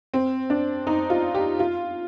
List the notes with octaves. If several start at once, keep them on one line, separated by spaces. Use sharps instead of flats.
C4
D4
D#4
F4
G4
F4